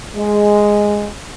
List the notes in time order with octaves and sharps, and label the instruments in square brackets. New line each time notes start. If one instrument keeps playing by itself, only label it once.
[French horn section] G#3